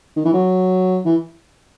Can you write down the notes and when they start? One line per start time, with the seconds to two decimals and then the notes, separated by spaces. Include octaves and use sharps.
0.16 D#3
0.25 E3
0.34 F#3
1.05 E3